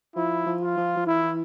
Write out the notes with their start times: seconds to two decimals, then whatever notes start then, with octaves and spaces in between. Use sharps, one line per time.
0.16 F3 E4
0.46 F3
0.62 F4
0.77 F3
0.97 F3
1.07 E3 E4